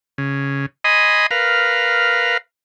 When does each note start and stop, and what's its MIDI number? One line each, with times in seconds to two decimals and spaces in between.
0.18 0.66 49
0.84 1.26 75
0.84 1.26 80
0.84 1.26 83
0.84 1.26 84
0.84 1.26 87
1.31 2.37 70
1.31 2.37 71
1.31 2.37 77